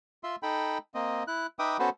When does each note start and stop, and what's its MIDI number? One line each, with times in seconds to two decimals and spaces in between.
0.24 0.36 65
0.24 0.36 76
0.24 0.36 84
0.43 0.78 63
0.43 0.78 69
0.43 0.78 79
0.43 0.78 83
0.95 1.23 58
0.95 1.23 60
0.95 1.23 75
1.27 1.47 64
1.27 1.47 90
1.59 1.77 63
1.59 1.77 71
1.59 1.77 76
1.59 1.77 79
1.59 1.77 86
1.59 1.77 87
1.79 1.90 59
1.79 1.90 61
1.79 1.90 66
1.79 1.90 69
1.79 1.90 71
1.79 1.90 72